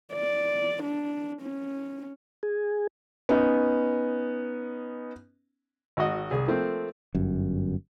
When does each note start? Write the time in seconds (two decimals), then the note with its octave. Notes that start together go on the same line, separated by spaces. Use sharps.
0.13 D5
0.84 D4
1.42 C#4
2.43 G#4
3.29 B3 C#4 D#4
5.97 G#1 F#4 D#5
6.31 C2 G#4
6.48 F3 A3 A#3 C4
7.15 G1 F#2